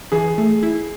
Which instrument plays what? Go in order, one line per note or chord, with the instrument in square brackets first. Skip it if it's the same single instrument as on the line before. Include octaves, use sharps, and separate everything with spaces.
[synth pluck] E3 [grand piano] G#4
[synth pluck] A3
E4